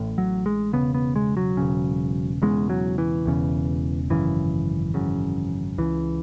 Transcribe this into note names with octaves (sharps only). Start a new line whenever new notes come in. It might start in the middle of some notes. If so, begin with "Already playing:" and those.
Already playing: A1 A2
F#3
G#3
D#2 C#3 B3
E1
B3
G#3
F#3
E1 D#2 C#3
E1 E2 C#3 G#3
F#3
E3
E1 E2 C#3
G#1 F#2 C#3 E3
G#1 F#2 C#3
C#2 C#3 E3